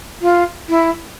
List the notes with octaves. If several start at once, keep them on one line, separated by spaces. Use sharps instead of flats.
F4
E4